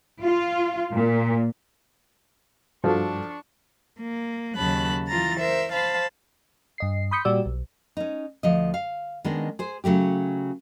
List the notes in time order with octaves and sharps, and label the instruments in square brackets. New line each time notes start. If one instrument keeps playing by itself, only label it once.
[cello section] F4
A#2
[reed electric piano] G2 [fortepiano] F3 [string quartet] D4 C#6 [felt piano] F#4 A4
[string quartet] A#3
D#2 C#3 F#3 A5 B5 F#6
E3 F4 A#5 A6
A#4 C5 E5
C5 F5 A5 B5
[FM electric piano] G2 D#5 C7
B5 C6 D#6 G6 B6 C#7
A#2 G3 F#4 G4 D5 E6
B1
[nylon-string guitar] C#4 D#4
D2 F3 D#5
F5
D#3 G#3 B3 C#4 D4
G#4 C5
C#3 F#3 A3 G4